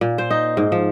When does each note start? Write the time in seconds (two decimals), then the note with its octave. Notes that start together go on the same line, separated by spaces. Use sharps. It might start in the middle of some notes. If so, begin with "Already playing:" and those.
0.01 A#2
0.18 C5
0.31 D#4
0.57 G#2
0.72 F3